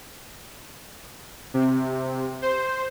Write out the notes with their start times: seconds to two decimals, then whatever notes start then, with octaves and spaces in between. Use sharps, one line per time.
1.54 C3
2.42 C5